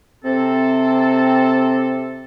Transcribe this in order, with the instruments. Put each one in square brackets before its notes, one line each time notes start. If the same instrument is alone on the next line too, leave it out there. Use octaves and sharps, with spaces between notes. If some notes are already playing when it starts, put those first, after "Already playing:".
[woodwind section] C3 C4 A4